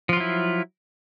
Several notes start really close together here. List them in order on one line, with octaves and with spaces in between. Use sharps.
F3 F4 F#3 E4